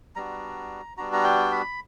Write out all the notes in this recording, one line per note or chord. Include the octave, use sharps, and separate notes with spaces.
G3 B3 D4 F#4 A#5
G3 B3 D4 F#4 A#5
A#5
G5
B5